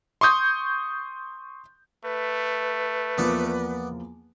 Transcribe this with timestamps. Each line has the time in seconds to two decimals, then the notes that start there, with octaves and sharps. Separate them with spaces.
0.21 C6 C#6 D#6 G6
2.05 A3 B4
3.18 E2 F3 A#3 B3 D5